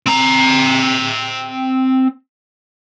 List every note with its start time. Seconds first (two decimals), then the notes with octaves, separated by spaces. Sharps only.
0.07 C4 A#5